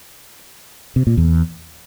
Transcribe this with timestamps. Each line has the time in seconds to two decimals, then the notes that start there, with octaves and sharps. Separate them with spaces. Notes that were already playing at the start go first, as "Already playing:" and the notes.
0.96 C3
1.07 A#2
1.17 E2